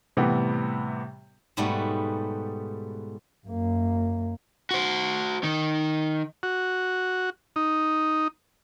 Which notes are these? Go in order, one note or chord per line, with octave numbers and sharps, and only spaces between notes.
A2 C3 E3 G3 B3 G4
G#2 B2 G3 A3 B3
F#2 A#3
F#4 C5
D#3
F#4
D#4